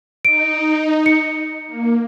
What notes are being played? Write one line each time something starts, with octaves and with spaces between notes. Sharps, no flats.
D#4 D7
C#7
A#3